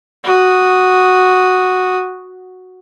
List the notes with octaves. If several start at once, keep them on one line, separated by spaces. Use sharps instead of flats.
F#4 D#6